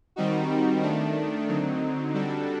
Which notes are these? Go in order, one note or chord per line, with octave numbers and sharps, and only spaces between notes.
D#3 G3 C4 D#4 F#4
D#3 A3 D4
D3 F#3 C4 D#4
D3 G3 D4 F#4 A4